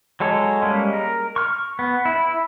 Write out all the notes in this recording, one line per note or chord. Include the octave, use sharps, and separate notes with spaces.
F#3 G#3 A4 C#5
G3 G#3 A#3 C#4
A#4
C#6 F6
B3
E4